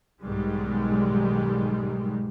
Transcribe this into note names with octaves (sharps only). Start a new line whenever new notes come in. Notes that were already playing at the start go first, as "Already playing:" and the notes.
B1 G#2 D#3 G3 G#3